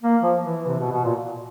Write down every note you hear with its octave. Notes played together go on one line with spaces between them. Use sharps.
A#3
F3
E3
C3
B2
B2
A#2